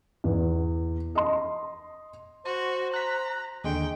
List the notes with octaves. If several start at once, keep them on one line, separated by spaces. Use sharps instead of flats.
E2
D#5 C6
F#4 C5
A#5 F#6 B6
D#2 D3 G#3 G5